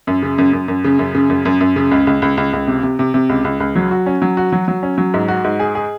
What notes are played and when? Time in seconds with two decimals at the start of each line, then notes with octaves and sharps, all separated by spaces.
0.07 F#2
0.23 C#3
0.38 F#2
0.53 F#2
0.68 F#2
0.84 C#3
0.99 F#2
1.15 C#3
1.30 F#2
1.45 F#2
1.61 F#2
1.76 C#3
1.91 C#2
2.07 C#2
2.22 C#2
2.37 C#2
2.53 C#2
2.67 C3
2.83 C3
2.99 C3
3.14 C3
3.29 C#2
3.45 C#2
3.60 C#2
3.76 F#3
3.91 F#4
4.06 C#4
4.22 F#3
4.37 F#4
4.53 F#3
4.68 F#3
4.83 C#4
4.98 F#3
5.14 G#2
5.28 F#4
5.44 G#2
5.60 G#4
5.75 G#4